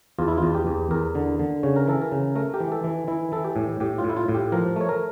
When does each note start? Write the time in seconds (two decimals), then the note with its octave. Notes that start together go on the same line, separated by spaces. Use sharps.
0.19 E2 F4
0.28 E4
0.38 F4
0.43 E2
0.55 G4
0.67 E2
0.91 E2 A#4
1.15 D3
1.39 D3
1.63 C#3 C#5
1.76 A#4
1.87 E3 A4
2.01 A#4
2.12 C#3
2.35 A3 A#4
2.54 G4
2.60 E3
2.72 A4
2.84 E3
3.08 E3 E4
3.32 E3 A4
3.44 G4
3.56 A2
3.80 A2 G4
3.98 F4
4.04 A2
4.10 E4
4.17 F4
4.28 A2
4.35 G4
4.52 F3 A#4
4.76 A3 C#5
4.89 A#4